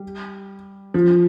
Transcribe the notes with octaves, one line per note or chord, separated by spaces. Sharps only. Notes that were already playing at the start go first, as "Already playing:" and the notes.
Already playing: G3
F3